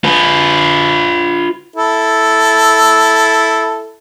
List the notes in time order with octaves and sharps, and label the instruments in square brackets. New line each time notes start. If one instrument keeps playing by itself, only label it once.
[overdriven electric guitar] F4 B4
[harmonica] E4 A4